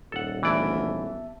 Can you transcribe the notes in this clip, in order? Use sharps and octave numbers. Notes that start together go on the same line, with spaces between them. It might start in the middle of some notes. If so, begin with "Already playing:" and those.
D#1 A4 F#5
D2 E3 B3 D5 E5 A5